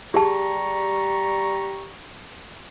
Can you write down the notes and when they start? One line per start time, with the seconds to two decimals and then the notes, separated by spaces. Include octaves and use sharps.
0.14 G3 G4 G#4 A5 A#5 C#6